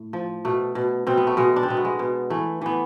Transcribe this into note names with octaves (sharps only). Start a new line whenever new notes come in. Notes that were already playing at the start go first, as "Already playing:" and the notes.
Already playing: A2
F3
B2 A3
B2
B2 C4
B3
A3
B2 G#3
D4
C4
B2 B3
A3
G#3
B2
E3 A3
E3 B3